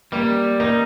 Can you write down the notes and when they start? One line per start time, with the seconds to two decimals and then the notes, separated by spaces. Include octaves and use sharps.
0.12 G3 A#3
0.60 A#3 D#4